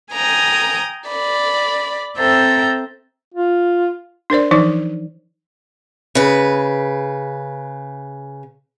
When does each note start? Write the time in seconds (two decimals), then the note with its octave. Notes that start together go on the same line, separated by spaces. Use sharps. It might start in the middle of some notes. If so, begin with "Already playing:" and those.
0.14 G5 G#5 A#5 D#6
1.09 D5 B5
2.16 C4 A4 C5 E5 G5 A#5
3.34 F4
4.30 D4 A#4 C5 D5
4.51 E3 F3 D#4 C5
6.15 C#3 B4